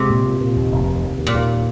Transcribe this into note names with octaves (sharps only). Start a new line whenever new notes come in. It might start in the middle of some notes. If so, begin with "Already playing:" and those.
Already playing: C3 G#3
A#2
A#2
A#2
D#2
F1
D#2
D#2
D#2
A#2
D#2